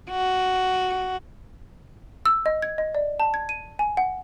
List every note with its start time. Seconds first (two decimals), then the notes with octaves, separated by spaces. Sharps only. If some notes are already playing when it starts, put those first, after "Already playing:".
0.10 F#4
2.26 E6
2.46 D#5
2.62 G#6
2.78 D#5
2.95 D5
3.20 A5
3.34 G#6
3.49 D#7
3.79 G#5
3.97 F#5